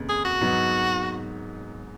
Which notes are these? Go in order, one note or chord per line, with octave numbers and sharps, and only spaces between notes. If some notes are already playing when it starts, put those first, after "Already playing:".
Already playing: F1 D#2 C#3
G#4
F#4
G#2 F#3 B3 D#4